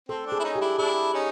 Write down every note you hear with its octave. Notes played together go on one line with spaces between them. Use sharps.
C4 A4
C4 D4
G#4
E4
C#4 D#4
G4
D4 E4
D4 E4 G#4
C#4 D#4